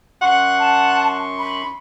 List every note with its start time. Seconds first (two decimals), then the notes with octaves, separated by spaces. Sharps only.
0.22 F#2 F#5 C6 C#6
0.60 A5
1.39 B5